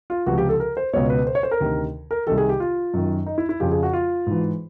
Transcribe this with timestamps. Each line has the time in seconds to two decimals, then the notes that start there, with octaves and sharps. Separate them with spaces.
0.10 F4
0.26 C#2 C3 F3 F#4
0.38 G4
0.49 A4
0.60 A#4
0.77 C5
0.93 C#2 B2 C#5
1.10 B4
1.27 C5
1.35 C#5
1.43 C5
1.51 A#4
1.61 D2 C3 D#3
2.11 A#4
2.27 C2 C3 D#3 A4
2.38 G#4
2.49 G4
2.60 F4
2.94 F#2 D#3
3.26 D#4
3.38 E4
3.49 E4
3.60 F2 C#3 F3 G4
3.71 G#4
3.83 F#4
3.93 F4
4.27 G#2 E3